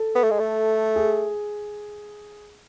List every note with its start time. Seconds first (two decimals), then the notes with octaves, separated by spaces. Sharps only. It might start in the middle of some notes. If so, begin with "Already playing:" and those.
Already playing: A4
0.15 B3
0.23 A3
0.31 G#3
0.39 A3
0.96 G#4